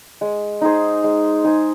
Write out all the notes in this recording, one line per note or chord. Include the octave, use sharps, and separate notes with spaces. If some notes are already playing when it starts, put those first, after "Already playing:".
G#3
D#4 G#4 C5
G#3
D#4 G#4 C5